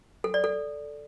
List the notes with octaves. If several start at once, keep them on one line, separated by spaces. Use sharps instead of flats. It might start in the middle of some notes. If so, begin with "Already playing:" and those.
A4
D5
A4